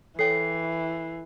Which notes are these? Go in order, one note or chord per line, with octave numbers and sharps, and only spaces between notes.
E3 A4 C#5 G5 C7